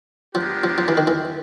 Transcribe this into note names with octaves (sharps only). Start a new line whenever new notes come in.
F3 G#3 B3 D4 G4 A#4
F3
F3
E3
D#3
E3